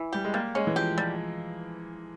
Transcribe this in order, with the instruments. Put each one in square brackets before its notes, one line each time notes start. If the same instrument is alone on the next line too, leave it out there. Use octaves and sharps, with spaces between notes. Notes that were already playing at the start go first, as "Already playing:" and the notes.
Already playing: [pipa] E3
[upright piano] G3 [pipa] G4
[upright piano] G#3
[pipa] G3 [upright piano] A#3
[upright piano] G#3 [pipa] C#4
[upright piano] E3
[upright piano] F3 [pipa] G4
[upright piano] F3 [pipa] G3